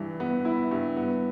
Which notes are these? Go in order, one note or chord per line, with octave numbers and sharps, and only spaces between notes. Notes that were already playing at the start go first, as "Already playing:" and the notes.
Already playing: G2 E3 E4
B3
E4
G2
B3